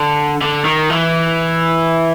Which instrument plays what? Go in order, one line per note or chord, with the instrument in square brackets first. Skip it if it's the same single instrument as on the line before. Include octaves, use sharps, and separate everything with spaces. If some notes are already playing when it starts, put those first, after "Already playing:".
Already playing: [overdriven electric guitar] D3
D3
D#3
E3